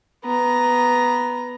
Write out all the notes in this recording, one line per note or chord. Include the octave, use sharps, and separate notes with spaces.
B3 A#5